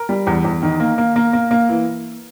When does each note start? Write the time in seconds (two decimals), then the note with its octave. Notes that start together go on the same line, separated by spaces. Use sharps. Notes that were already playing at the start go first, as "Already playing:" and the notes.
Already playing: A#4
0.09 G3
0.27 E2
0.45 E2
0.63 D#3
0.80 A#3
0.98 A#3
1.16 A#3
1.33 A#3
1.51 A#3
1.69 E3